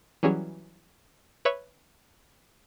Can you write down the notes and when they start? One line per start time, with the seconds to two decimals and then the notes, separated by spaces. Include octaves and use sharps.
0.23 E3 F#3 G3 C#4 G#4 C#5
1.45 B4 C#5 E5 C#6 G#6